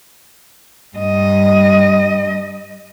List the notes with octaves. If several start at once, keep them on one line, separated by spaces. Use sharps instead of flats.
G2 D#5